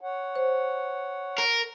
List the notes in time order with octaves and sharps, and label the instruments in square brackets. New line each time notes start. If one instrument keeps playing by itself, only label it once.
[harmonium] C#5 F#5
[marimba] C5
[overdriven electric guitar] A#4